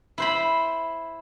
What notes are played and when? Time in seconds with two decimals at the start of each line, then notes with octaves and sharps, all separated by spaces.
0.18 E4 C5 B5